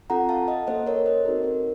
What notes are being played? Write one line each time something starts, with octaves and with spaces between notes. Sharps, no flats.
C4 F4 A4 F#5 A#5
F5 A5
D#5 F#5
A#3 C#4 A4 C5 D#5
A#4 C#5
C5 D#5
C4 D#4 F#4 A4 A#4
A#4